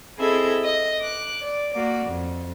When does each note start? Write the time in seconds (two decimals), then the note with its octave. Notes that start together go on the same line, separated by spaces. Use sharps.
0.19 C4 E4 G#4 A4 D#5 E5
0.64 D#5
1.01 D6 F#6
1.42 D5
1.74 A#3 F#4 D5
2.07 F2